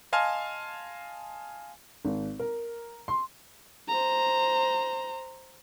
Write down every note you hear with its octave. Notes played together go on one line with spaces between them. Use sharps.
D#5 F5 G#5 A5 C6 F6
G#1
A#4
C6
C5 A#5